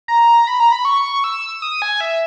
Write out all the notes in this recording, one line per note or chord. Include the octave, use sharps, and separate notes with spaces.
A#5
B5
A#5
B5
C#6
E6
D#6
G#5
E5